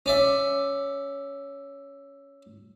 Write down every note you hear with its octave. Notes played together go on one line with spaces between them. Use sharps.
C#4 D5 E5